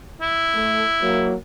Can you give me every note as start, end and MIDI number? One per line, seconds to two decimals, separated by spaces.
0.21 1.33 64
0.55 0.83 57
1.02 1.34 54
1.02 1.34 58